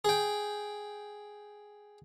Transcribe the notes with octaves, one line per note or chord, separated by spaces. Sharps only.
G#4 G5